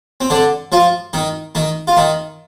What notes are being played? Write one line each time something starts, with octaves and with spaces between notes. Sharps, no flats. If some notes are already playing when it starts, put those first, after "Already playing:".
C4
D3 D4
F3 F4
D#3 D#4
D#3 D#4
F4
D#3 D#4